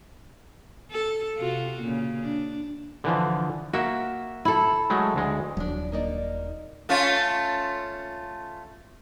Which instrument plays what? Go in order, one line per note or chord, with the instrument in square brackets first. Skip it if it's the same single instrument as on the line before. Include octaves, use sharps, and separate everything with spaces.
[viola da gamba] A4
C3 F4 F#4
A#2 C#3
D4
[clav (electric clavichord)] D3 E3 F3
[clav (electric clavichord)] A#3 F#4 [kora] E5
[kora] E4 A4
[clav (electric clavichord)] F#3 G#3 A3
D2 G#3
[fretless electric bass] D#1 F#3 [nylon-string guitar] F3 D4
[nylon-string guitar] A#3 D#4 D5
[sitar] A3 C#4 F4